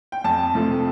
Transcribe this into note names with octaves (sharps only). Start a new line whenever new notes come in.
G5
F2 A5
C3 F3 A3